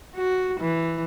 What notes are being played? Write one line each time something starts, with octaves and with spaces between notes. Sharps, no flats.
F#4
E3